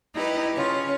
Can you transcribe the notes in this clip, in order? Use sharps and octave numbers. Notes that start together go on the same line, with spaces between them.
D#4 E4 G4 B4
C#3 C#4 F4